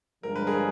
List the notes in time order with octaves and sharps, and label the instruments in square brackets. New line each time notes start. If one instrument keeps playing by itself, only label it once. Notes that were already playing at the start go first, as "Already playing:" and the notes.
[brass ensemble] G2 D3 F3 G#3 [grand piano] A#4
[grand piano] B4
G#4 A#4